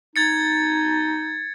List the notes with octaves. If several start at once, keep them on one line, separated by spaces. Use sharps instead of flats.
D#4 G#6 A6 C#7